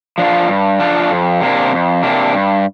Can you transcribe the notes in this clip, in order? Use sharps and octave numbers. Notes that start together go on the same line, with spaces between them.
F3 D4 F4
G2
F3 D4 F4
F2
C3 A#3 D4
F2
C3 A#3 D4
G2